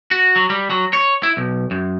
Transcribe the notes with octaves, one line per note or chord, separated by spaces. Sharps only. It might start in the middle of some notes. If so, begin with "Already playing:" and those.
F#4
F#3
G3
F#3
C#5
E4
B1
F#2